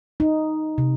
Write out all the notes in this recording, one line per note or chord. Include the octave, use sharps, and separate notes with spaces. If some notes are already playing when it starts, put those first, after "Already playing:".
D#4
C3